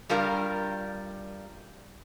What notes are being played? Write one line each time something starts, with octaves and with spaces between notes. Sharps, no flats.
G2 G3 F4 A#4 A#5